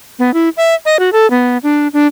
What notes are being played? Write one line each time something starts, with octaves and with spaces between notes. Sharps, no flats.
B3
E4
E5
D#5
F#4
A4
B3
D4
D4